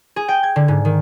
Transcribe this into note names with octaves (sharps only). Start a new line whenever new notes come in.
G#4
G5
G#6
D3
G#2
D#3